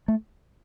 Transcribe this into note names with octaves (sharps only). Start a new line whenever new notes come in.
A3